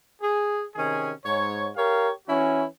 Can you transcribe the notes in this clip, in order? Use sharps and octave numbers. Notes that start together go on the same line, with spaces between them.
G#4
C3 D#3 C#4 G#4
G#2 C#5
G4 A#4 C#5 F5
E3 C#4 E4 F#4